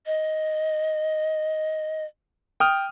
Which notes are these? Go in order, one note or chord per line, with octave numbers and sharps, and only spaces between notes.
D#5
G5 D#6 F6